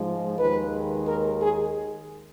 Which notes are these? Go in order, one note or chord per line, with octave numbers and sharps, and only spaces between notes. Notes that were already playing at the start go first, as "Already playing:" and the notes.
Already playing: G#2 F3 G#3
D#2 D#3 G#3 B4
A#4
G#4